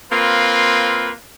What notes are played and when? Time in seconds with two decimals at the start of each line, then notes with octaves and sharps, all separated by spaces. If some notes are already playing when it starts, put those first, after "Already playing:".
0.12 A#3 C4 F4 B4